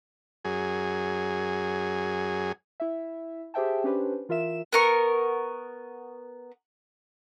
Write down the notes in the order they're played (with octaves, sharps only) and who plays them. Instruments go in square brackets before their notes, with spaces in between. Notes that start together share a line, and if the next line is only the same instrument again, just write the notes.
[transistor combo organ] F#2 G#4
[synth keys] E4 E5
G4 G#4 C5 E5 G5 A5
C#4 D4 G4 B4 C5
E3 F4 A#4 E5 E7
[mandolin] B3 A#4 C#6